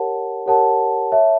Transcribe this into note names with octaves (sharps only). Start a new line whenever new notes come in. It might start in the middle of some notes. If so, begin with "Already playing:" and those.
Already playing: G4 A#4 C#5 F#5 A5
G4 A#4 C#5 F#5 A5
C#5 E5 A5